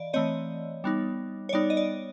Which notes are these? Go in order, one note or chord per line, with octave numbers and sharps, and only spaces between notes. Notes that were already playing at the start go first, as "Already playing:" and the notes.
Already playing: E3 D5 D#5 F5
E3 A3 C4 C#5 D#5
G3 B3 D#4
C#5
G3 B3 D#4 D5
D#5
D5